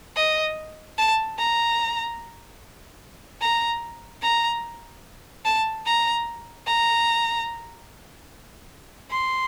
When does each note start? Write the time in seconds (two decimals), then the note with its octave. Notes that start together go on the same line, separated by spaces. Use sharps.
0.16 D#5
0.98 A5
1.38 A#5
3.41 A#5
4.23 A#5
5.45 A5
5.86 A#5
6.67 A#5
9.11 C6